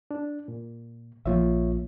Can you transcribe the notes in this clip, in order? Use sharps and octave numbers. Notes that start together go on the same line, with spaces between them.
D4
A#2
A#1 F3 A#3 F4 C#5 E5